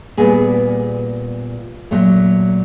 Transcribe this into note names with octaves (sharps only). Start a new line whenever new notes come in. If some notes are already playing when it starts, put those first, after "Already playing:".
A#2 G3 B3 G#4
A#2 F#3 A3